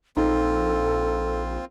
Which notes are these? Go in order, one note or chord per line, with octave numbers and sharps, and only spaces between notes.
A#1 C4 D#4 F4 A4